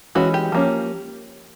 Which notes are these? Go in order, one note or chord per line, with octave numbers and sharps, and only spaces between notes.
E3 G#3 C#4 F#4
G4
F3 A#3 C#4